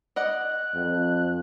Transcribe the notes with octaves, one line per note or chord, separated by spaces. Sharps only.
D5 D#5 F#5 F#6
F2